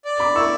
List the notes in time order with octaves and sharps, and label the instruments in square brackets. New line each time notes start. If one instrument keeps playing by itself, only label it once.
[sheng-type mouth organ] D5
[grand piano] B5 D6
[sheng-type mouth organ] E4 [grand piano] C#6 E6